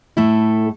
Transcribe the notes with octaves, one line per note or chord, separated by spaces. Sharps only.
A2 A3 E4 A4